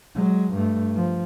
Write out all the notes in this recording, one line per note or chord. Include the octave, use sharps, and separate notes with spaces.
F#3 G#3
G2 A3
F3